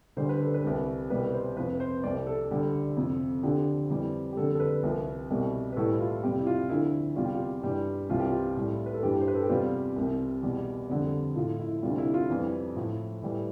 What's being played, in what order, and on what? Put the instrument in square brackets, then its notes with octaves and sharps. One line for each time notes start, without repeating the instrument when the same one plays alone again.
[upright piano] D2 D3 G3 C5
B4
A4
B4
C2 C3 G3
C2 B2 G3 B4
C5
F2 C3 F3 B4
B4
C5
C2 C3 G3 D5
A4
D2 D3 G3
F2 C3 F3
D2 D3 F3 G4
F2 E3 G3
G4
F2 D3 G3 A4
A4
B4
C2 C3 F3
C2 B2 G3
B4
A2 E3 G3 A4
F4
F2 C3 G3 G4
E4
F4
D2 D3 F3 E4
E2 C3 G3 F4
G4
F4
G2 E3 G3
C2 C3 E3 G3 F4
G4
F4
A2 G3
B4
A4
G2 E3 G3 G4
C5
B4
A4
G4
E2 C3 G3 F4
C2 C3 G3
E2 B2 G3
F2 D3 G3
A2 F3 F4
E4
D2 C3 G3 F4
E4
F4
F2 E3 G3
A2 F3
A2 E3 G3 E4